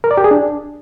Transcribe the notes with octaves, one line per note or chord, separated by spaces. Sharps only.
A#4
D5
G4
G#4
D4